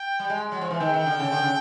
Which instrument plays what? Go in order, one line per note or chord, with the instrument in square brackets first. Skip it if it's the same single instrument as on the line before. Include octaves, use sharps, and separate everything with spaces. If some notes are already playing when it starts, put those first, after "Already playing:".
Already playing: [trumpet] G5
[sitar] G3
G#3
F#3
F3
E3
[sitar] D#3 [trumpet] G5
[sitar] D#3
D3
C#3
D3
C#3